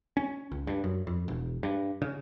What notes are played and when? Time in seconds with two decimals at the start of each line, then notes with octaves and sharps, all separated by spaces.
0.17 C#4
0.52 C#2
0.67 G2
0.84 F#2
1.07 F2
1.28 E1
1.63 G2
2.02 C#3